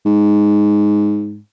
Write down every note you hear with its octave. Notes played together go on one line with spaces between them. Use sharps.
G#2